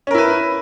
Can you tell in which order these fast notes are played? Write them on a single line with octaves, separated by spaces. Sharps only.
C#4 A#4 E4 B4